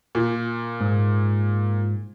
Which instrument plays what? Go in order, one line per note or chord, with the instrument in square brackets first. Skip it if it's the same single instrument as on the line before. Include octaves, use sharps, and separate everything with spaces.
[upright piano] A#2
[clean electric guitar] G#2